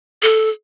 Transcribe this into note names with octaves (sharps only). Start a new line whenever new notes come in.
A4